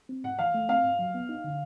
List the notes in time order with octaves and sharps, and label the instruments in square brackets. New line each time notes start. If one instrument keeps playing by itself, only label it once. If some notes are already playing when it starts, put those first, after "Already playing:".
[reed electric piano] C4
[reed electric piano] G#2 [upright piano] F#5
[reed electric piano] E3 [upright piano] F5
[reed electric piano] A3
[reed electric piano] C4 [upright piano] F5
[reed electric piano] G#2
F#3
B3
D#4
D3